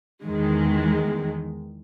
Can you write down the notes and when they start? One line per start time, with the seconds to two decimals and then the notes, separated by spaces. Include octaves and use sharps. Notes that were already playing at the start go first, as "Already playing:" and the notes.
0.24 E2 D#3 G#3